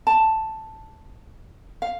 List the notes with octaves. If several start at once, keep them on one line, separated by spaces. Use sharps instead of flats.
A5
F5